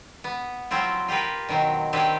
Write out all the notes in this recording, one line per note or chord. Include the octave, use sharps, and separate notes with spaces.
B3
F3 F#3 C4 E4 F4
F4 G4 A#4 B4
B2 D#3 F#3 C4
D#3 C4 D4 E4 G4 B4